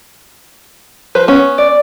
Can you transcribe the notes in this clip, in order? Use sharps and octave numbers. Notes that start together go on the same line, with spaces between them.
F3 B4 C5
B3 C#4
D5